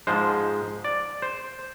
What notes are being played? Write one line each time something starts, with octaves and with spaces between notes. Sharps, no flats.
G#2 F3 G#3 C5
D5
C5